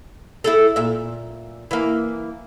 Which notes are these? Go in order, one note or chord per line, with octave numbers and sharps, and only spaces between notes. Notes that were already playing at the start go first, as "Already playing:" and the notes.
E4 G#4 A4
A#2 E5
E3 A#3